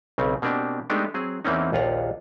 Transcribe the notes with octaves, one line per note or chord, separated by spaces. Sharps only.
B1 C#3 C4
B2 A#3 C4 D4 G4
G#3 A3 B3 D4 D#4 G4
F#3 C4 G#4
E2 E3 A#3 C4 C#4 D#4
A#1 D#2 F4 F#5 A#5